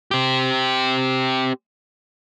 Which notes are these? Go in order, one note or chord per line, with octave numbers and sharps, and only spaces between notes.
C4 G4